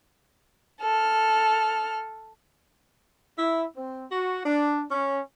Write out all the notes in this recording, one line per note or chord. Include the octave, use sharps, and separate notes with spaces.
A4 F6
E4
C4
F#4
D4
C#4